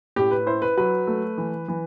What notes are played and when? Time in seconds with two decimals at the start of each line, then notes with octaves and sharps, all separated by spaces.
0.16 A2 G4
0.31 B4
0.46 E4 C5
0.62 B4
0.77 F#3 B4
1.07 A3
1.38 E3
1.68 E3